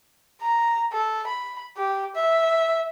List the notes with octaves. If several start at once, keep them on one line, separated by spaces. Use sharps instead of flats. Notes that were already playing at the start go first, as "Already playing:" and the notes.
A#5
A4
B5
G4
E5